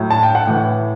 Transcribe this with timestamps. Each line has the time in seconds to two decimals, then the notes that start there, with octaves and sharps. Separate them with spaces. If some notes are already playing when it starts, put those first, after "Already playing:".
Already playing: A2 F#3
0.10 A5
0.23 G5
0.35 F#5
0.47 A2 E3